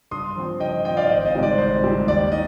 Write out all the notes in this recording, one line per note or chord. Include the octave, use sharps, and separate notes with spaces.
G2 C6 D#6
F3 C4
G2 D#5 G5
F3 C4 D#5 G5
D5 F5
G#1 C5 D#5
C5 D#5
G#2 G3 C4
D5
G#1 C5
G#2 G3 C4
D#2 D5
D#3 D#5